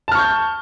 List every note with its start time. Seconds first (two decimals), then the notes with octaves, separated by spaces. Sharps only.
0.08 A5
0.12 F6
0.15 C#6
0.19 G6